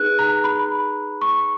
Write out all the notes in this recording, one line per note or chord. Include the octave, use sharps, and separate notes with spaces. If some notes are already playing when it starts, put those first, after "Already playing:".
Already playing: D#4 G#4 B4 F#6
A#5
B5
C#6